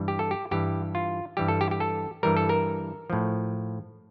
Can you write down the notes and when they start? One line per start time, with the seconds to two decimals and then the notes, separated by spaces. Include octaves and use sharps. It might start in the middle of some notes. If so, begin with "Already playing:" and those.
Already playing: G2 E3 G3
0.08 G4
0.19 A4
0.31 G4
0.51 G2 E3 G3 G4
0.95 F4
1.37 G2 E3 G3 G4
1.48 A4
1.61 G4
1.71 G4
1.80 A4
2.23 G2 E3 G3 A#4
2.37 A4
2.49 A#4
3.10 A2 F3